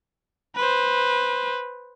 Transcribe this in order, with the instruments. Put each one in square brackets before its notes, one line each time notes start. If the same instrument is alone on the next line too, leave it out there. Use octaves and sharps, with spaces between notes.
[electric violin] B4 C5